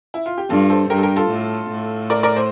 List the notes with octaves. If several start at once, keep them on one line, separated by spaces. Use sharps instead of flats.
E4
F4
G4
G2 F4 A4
A4 C5
G2 G4 A#4
A4
G4 A#4
F4 A4
A2
A2
A#4 D5
A#4 D5
C5